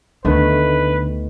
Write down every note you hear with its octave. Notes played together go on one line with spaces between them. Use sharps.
D2 D3 D#3 A3 B3 B4